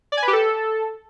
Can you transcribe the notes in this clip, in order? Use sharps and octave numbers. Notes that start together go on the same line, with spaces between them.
D5
G#5
B4
G4
A4